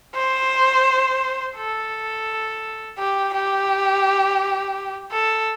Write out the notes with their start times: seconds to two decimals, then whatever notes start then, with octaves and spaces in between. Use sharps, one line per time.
0.15 C5
1.56 A4
2.99 G4
3.34 G4
5.12 A4